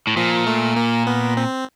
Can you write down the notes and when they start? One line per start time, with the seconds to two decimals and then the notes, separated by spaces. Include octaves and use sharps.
0.07 A2
0.17 A#2 F3
0.46 A3
0.76 A#3
1.07 B3
1.37 C4